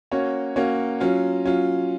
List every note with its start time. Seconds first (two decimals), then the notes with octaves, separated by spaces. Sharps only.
0.11 A#3 C#4 F#4 C#5
0.56 A#3 C#4 F#4 C#5
1.00 F#3 C#4 F4
1.46 F#3 C#4 F4